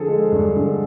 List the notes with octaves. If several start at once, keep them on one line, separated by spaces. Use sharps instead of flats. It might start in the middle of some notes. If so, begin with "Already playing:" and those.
Already playing: D3 F3 G#4 A4
G#3
G2
D3